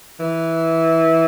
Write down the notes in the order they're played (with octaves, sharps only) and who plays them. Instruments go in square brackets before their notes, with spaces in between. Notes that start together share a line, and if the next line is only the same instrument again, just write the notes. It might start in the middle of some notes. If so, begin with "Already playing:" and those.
[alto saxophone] E3